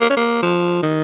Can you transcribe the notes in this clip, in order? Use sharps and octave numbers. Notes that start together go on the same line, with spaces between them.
A#3
C#4
A#3
F3
D#3